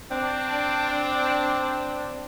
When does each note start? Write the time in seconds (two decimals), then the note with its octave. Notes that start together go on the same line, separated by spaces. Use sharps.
0.11 C4 D4